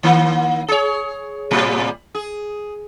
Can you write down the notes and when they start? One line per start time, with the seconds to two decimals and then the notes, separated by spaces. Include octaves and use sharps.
0.03 D#3 A#3
0.68 G#4 C#5
1.51 A2 C3 G3
2.15 G#4